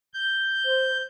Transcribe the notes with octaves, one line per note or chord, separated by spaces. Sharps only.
G6
C5